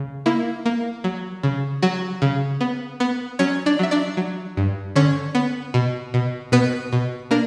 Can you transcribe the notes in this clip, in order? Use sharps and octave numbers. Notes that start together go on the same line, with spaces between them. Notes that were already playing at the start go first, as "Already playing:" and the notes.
Already playing: C#3
A#3 E4
A#3
F#3
C#3
F#3 F#4
C#3
B3
B3
F#3 C#4 C#5
D4 D5
F#3 E5
D4 D5
F#3
G2
D3 C#4 C#5
B3
B2
B2
B2 B3 B4
B2
A#3 D4 A#4